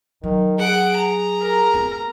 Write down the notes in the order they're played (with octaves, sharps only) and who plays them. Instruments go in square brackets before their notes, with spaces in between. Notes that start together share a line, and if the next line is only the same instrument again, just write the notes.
[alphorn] D#3 [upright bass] F#3
[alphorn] G#4 [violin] F#5 D7
[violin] A#5
[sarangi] A#4
[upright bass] A3 B3